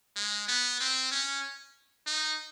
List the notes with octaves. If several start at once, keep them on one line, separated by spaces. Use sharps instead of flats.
G#3
B3
C4
C#4
D#4